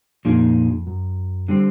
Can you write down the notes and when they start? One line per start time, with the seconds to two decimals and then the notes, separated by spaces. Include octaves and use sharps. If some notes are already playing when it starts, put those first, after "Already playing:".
0.25 F2 A#2 F3 A#3 D#4 G#4
0.87 F#2
1.48 D3 G3 C4